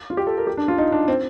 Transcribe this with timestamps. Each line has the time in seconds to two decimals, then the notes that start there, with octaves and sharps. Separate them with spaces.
0.10 F4
0.17 G4
0.27 A4
0.38 A#4
0.47 G4
0.57 D4
0.68 F4
0.78 D#4
0.92 D4
1.08 C4